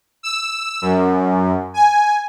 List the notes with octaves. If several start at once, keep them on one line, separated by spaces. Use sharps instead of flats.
E6
F#2
G#5